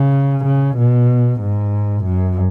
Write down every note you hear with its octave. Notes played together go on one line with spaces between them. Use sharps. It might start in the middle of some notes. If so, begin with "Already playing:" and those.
Already playing: C#3
C#3
B2
G#2
F#2